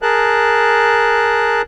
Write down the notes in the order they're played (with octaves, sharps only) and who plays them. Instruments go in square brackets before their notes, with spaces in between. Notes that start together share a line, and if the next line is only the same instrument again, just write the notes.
[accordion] G#4 A#4 A5 F#6